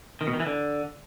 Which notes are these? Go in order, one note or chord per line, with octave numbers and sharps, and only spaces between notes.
D#3
B2
D#3
E3
D3